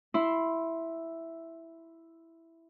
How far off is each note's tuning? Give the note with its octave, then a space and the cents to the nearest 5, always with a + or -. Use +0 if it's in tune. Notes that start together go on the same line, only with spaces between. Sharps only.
E4 +0 E5 +0 C6 +5